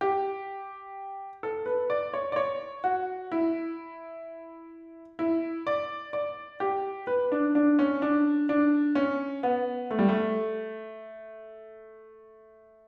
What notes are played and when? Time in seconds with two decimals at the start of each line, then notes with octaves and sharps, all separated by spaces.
0.01 G4
1.43 A4
1.66 B4
1.90 D5
2.14 C#5
2.32 D5
2.36 C#5
2.84 F#4
3.32 E4
5.19 E4
5.67 D5
6.13 D5
6.60 G4
7.07 B4
7.32 D4
7.55 D4
7.79 C#4
8.02 D4
8.49 D4
8.95 C#4
9.43 B3
9.91 A3
9.99 G3
10.09 A3